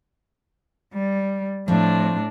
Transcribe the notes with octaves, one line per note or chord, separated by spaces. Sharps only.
G3
A2 F3 C4 D4